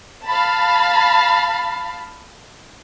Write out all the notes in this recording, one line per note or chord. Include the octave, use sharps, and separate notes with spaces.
F5 A5 B5